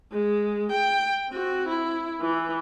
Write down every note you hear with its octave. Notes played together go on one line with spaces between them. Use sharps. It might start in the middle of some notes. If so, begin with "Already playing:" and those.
G#3
G5
C4 F#4
E4
E3